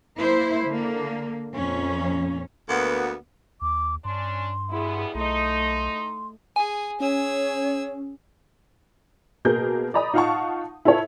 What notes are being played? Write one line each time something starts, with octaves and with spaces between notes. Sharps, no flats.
A#3 E4 C5
D3 A#3
F2 A#2 C#4
D2 A#3 B3
D#2 D6
G2 C#4 D4 C6
B2 G3 B3 E4 G#4
B1 A3 D#4 D#5 C6
G#4 G#5
C#4 G#4 C#5 E6
B2 A#3 G#4 A#4 G6
D5 D#5 A#5 B5 D#6
D#4 F4 F5 F#5 A5 C#6
E4 F4 A4 C#5